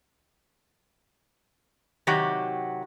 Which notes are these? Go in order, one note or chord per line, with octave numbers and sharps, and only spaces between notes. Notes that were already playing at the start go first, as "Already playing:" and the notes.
C3 D#3 F#3 F#4 G4